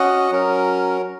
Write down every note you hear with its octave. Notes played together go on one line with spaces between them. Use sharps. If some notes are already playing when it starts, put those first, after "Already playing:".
Already playing: C#4 F#4 D#5 F#5
F#3 C#4 A#4